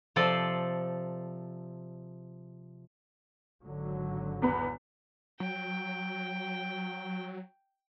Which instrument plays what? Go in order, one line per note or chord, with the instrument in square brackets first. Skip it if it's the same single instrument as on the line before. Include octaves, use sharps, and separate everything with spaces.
[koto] C3 F3 A4 C5 D5
[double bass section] G#1 D3 F#3
[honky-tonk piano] E2 B3 B5
[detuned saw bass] F#3 [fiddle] G5